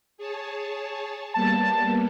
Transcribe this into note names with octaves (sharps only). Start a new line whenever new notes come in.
G#4 C#5 A5
G3 A#3 B3 A5